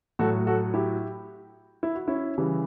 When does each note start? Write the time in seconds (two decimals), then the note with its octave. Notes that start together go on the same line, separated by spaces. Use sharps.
0.19 A2 F#3 F#4 A4
0.47 F#4 A4
0.74 E4 G4
1.83 E4
1.95 F#4
2.07 C#4 E4
2.38 C#3 E3 G3